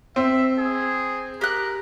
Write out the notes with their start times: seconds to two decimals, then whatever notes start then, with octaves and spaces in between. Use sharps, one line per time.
0.16 C4 E5
0.58 G#4
1.41 G4 A#4 F#6